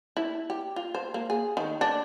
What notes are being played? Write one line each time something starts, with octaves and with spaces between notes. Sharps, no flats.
E4
G4
F4
C5
A#3
G#4
D#3
D4